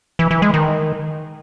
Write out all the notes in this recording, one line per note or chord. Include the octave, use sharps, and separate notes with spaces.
E3
E3
G#3
D#3